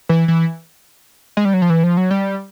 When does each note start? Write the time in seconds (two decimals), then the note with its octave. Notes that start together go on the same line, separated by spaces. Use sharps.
0.09 E3
0.28 E3
1.37 G#3
1.45 G3
1.54 F#3
1.62 F3
1.70 E3
1.83 F3
1.97 F#3
2.11 G3